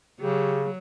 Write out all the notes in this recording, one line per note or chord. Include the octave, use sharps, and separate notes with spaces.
C#3 F#3 G4 G#4